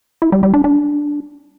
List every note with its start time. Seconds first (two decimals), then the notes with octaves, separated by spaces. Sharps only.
0.22 E4
0.32 G3
0.43 G3
0.54 D4
0.64 D4